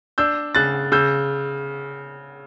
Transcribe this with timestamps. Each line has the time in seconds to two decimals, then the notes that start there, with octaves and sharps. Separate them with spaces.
0.18 D4 E6 G6
0.55 C#3 F#6 A6
0.92 C#3 E6 G6